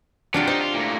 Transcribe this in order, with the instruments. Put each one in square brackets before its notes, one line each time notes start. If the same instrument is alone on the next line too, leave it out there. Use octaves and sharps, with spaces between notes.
[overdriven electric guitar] C3 F#3 [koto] D4 F4 G4
[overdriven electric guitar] D#4 [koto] C5 D5
[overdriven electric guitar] F4
A2 A#3